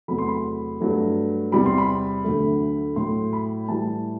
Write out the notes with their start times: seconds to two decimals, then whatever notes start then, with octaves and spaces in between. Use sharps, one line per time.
0.08 E2 C3 F#3 A3 B5
0.18 C6
0.28 B5
0.81 G2 F#3 A3
1.52 E2 C3 G3 B5
1.66 C6
1.78 B5
2.25 D2 D3 F#3 A3
2.96 A2 F#3 A3 C6
3.33 B5
3.68 A2 E3 G3 A5